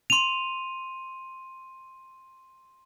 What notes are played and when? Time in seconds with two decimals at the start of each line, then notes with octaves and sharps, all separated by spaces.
0.10 C6 D#7 F7